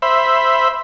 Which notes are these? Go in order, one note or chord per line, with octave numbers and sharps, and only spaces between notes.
C5 E5 B5